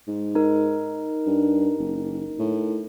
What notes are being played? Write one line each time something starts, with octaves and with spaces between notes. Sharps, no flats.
G#2
D#4 A#4
G2
F#1
A2